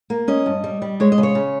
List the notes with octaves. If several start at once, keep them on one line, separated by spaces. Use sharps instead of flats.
A#3
C#4 D#5
G2
G3
G3
G#3 C#5
D#5
C#3
C#5
C#3